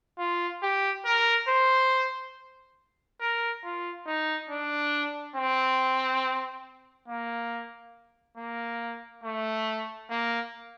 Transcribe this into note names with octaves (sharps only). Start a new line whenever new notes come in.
F4
G4
A#4
C5
A#4
F4
D#4
D4
C4
A#3
A#3
A3
A#3